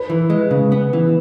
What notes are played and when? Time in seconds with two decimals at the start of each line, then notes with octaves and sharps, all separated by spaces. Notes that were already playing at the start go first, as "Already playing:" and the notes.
Already playing: B4
0.10 E3
0.30 G#3
0.51 C#3
0.72 B3
0.93 E3